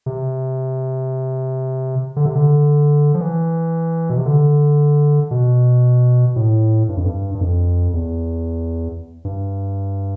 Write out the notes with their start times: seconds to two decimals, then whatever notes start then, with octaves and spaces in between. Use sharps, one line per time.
0.06 C3
2.16 D3
2.25 C3
2.35 D3
3.14 F3
3.21 E3
4.10 B2
4.17 C3
4.25 D3
5.31 B2
6.36 A2
6.89 G2
6.97 F2
7.05 G2
7.35 G2
7.41 F2
7.94 E2
9.25 G2